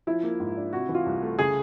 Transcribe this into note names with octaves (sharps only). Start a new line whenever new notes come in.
F3 E4
A#3
G#2
D4
C3 F#4
E3
F4
C2
A3
C#3 G#4